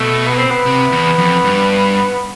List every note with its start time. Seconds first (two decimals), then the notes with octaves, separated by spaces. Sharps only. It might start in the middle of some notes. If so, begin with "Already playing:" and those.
Already playing: B2 A3
0.27 B3
0.38 C4
0.51 B3
0.66 C3
0.92 E2
1.18 F2
1.44 G2